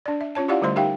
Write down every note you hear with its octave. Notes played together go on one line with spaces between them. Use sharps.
D4 D5
E5
C#4 F4 C#5 A5
E4 F4 G4 D5 F5 F#5
D3 G3 A3 C5 C6
D#4 G4 A#4 E5 F5 G5